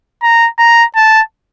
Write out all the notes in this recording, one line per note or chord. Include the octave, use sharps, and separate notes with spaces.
A#5
A#5
A5